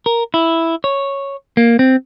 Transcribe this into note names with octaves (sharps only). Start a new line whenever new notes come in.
A#4
E4
C#5
A#3
C4